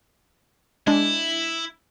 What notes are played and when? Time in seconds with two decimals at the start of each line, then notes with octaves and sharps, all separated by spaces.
0.87 G#3 D4 E4